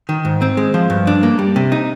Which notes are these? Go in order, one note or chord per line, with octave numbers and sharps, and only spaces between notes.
D#3
G#2
C4
G#3
F3
G2
D4
A#3
G3
C3
D#4